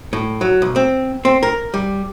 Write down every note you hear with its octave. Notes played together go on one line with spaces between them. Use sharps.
A2
F#3
B1
C4
C4
A#4
G3